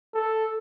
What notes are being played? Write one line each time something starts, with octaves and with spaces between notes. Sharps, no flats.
A4